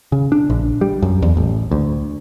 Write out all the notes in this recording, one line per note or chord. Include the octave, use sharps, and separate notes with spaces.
C#3
D4
A#1
G3
F#2
E2
A1
D2